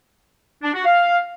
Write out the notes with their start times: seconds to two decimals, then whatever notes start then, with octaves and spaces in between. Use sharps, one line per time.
0.63 D4
0.74 F#4
0.85 F5